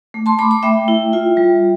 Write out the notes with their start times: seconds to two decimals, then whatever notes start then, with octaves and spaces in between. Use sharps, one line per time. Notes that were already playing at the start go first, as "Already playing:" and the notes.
0.14 A3
0.26 A5 C6
0.39 A3 B5 D6
0.51 B5 D6
0.63 A3 E5 G5
0.88 E4
1.13 F4
1.37 G3